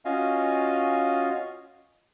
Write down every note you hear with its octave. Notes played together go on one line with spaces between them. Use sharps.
C#4 F4 F#4 D#5 F5 G#5